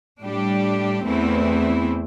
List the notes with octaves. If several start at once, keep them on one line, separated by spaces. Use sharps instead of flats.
A2 G3 D4 G4
E2 E3 A3 C4 E4